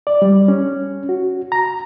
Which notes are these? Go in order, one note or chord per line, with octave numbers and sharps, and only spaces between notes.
D5
G3
C#4
F#4
A#5